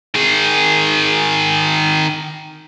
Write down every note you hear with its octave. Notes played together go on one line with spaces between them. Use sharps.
D#3 G#4